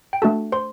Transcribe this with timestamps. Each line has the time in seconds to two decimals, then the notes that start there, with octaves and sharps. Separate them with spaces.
0.13 G5
0.22 A3 D4 F#4 A4 A5
0.52 C5 C6